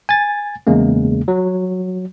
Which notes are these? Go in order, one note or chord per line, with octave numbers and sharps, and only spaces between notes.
G#5 A6
E2 C#3 G#3 A#3
F#3